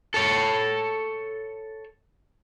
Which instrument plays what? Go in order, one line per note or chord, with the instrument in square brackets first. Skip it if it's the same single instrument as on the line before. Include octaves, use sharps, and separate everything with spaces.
[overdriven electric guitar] A4 C#5